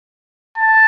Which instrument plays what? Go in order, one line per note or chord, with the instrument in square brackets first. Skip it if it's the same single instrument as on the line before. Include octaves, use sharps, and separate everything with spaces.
[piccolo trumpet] A5